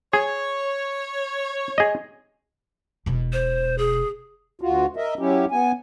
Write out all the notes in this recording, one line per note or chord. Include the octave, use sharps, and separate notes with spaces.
G#4 C#5
G#4 D#5
E1 B2
C5
G#4
D2 F4 F#4
A#4 D#5 E5
F#3 C#4 E4 G4
B3 G#5